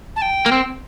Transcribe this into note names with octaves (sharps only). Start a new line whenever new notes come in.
A5
G5
A#3
C4